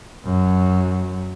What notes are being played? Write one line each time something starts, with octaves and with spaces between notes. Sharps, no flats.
F#2 F#3